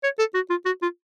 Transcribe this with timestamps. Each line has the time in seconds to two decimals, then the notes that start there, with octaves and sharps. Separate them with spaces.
0.03 C#5
0.19 A4
0.34 F#4
0.50 F4
0.65 F#4
0.82 F4